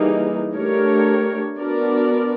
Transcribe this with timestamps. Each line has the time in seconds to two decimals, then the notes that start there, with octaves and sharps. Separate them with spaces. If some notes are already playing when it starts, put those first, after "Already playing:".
Already playing: E3 G3 A#3 D#4 G#4
0.56 A3 D4 G4 A#4 C#5
1.59 B3 D4 F#4 A#4 D5